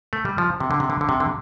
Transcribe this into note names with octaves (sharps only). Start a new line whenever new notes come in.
A3
G3
F3
C3
D3
C3
D3
D3
C3
D3